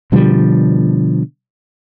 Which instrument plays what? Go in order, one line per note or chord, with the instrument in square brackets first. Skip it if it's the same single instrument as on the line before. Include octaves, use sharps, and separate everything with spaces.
[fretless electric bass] B2 D3 F3 G3